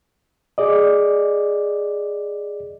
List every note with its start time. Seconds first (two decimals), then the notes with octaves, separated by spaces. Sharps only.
0.58 G#4 D5 D#5